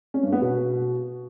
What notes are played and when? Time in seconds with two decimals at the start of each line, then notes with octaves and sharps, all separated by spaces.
0.14 C#4
0.23 G2
0.32 B3
0.42 B2